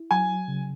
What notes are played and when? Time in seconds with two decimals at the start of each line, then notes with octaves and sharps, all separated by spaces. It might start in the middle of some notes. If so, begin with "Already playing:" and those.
Already playing: E4
0.11 F#3 G#5
0.48 C#3